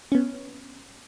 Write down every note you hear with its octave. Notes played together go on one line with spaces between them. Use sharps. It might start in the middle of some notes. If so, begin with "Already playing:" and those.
B3 C#4